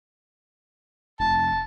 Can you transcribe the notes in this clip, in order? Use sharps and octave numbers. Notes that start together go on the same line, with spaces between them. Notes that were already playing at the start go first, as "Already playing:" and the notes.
F1 A5